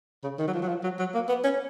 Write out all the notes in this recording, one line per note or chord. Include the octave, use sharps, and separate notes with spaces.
C#3
D#3
F#3
F3
F#3
F3
F#3
F#3
A#3
B3
C#4